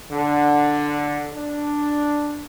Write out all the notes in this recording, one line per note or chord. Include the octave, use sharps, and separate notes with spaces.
D3
D4